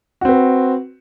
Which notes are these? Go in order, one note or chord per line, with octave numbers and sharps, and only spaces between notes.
C4 F#4 B4